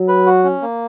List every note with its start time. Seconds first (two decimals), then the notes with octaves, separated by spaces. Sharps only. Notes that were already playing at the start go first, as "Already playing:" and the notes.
Already playing: F#3
0.08 B4
0.26 F#4
0.44 C#4
0.62 A#3